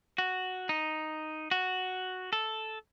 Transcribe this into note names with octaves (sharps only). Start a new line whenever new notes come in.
F#4
D#4
F#4
A4